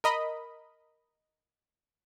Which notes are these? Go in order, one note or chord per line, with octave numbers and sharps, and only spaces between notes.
A#4 D#5 B5